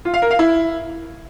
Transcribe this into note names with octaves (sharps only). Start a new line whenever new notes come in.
F4
F5
A#4
F5
E4